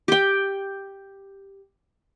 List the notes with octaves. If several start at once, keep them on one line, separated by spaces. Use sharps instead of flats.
G4 G5